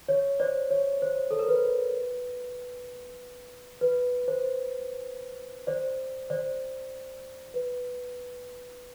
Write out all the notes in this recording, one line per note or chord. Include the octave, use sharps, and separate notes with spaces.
C#5
C5 D5
C#5
C5
A4
A#4
B4
B4
C5
C5 D5
C5 D5
B4